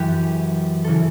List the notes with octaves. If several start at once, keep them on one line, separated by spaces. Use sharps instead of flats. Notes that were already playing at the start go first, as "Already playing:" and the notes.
Already playing: F#2 E3 G4
C#3 E3 A4